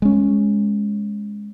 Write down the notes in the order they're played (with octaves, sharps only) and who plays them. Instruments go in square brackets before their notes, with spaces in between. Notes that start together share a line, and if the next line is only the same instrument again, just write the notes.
[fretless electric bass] G#3 C#4